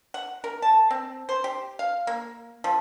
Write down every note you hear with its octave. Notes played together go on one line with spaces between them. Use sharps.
F#5
A#4
A5
C4
C5
G4
F5
A#3
F3